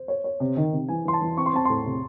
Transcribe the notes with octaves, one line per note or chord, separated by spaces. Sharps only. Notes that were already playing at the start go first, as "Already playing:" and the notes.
Already playing: C5
C#5
C#5
C3
D#3
C3
E3 G#5
E3 C6
A5
E3
C4 C#6
C6
C4 A5
A2 C6
C3